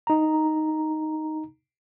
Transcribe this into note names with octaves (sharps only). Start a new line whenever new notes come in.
D#4 A#5